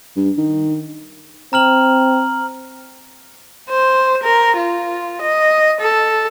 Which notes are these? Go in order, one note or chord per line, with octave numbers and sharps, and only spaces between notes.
G2
D#3
C4 A#5 F6 F#7
C5
A#4
F4
D#5
A4